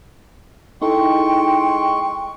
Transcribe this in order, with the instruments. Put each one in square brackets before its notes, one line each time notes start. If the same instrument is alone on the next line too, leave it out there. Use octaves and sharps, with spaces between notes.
[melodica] G#3 C6 C#6 [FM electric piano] D#4 E4 A4 [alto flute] G5